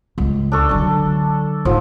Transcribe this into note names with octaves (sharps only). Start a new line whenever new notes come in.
C#2 G#3
D4 A4 C#6
D3 F#3
G#2 F3